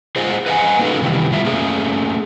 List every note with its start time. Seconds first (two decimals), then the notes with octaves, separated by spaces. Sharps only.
0.16 F4 G#4 C5 D#5 F#5
0.46 B4 D#5 F#5 G#5
0.79 A#3 C#4 D#4 F#4 A4 B4
1.02 C3 D#3 E3 G3
1.31 B2 G3 F4 E5
1.45 A3 A#3 C#4 G#4